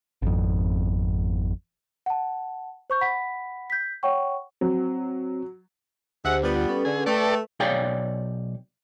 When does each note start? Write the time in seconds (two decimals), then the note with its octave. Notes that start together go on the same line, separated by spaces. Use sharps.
0.22 G#1 F2
2.06 F#5 A5
2.90 C5 C#6 G6
3.01 F#5 B5 B6
3.70 G6 B6
4.03 C#5 F#5 G5 C#6
4.61 F#3 C4
6.25 D2 G#3 G4 C5 E5 F#5
6.43 G3 B3 F4
6.69 C#4 A4 B4
6.85 D3 G#4
7.06 A3 A4 B4 D5 G5
7.60 B1 G#4 C#5 D5 F5 G5